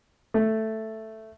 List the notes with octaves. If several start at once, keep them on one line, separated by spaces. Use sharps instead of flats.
A3